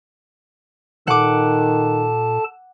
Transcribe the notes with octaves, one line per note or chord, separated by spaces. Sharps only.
A#2 D#3 A4 F#5 A5 D6